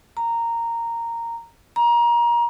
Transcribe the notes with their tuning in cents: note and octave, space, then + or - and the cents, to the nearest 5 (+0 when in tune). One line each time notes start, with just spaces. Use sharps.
A#5 -10
A#5 +25